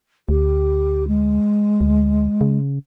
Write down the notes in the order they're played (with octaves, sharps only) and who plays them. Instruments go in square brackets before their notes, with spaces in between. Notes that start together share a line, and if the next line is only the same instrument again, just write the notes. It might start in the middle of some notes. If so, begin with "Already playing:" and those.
[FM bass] D2 [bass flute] G4
[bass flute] G#3
[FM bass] D2
C#3